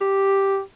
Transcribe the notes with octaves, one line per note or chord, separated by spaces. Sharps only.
G4